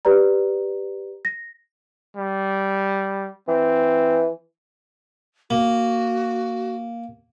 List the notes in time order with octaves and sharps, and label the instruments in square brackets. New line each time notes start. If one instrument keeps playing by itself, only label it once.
[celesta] G4 B4 D5 A#5
A#6
[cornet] G3
[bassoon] E3 [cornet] C4
[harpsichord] A#3 [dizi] F#4